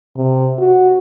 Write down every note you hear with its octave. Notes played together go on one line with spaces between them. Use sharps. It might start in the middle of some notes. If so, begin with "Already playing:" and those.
C3
F#4